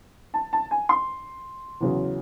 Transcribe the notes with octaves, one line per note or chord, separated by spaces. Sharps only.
A5
A5
G#5
C6
E2 C#3 F#3